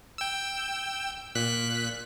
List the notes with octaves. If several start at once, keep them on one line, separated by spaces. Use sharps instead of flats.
G5 E6
A#2 F#6 B6